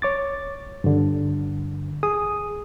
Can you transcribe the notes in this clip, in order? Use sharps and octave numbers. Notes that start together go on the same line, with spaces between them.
C#5 D6 A6
G2 D3
G#4 D#6